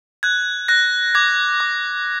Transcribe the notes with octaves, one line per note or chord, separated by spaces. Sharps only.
F#6 G#6
F#6 A#6
D6 G#6
D6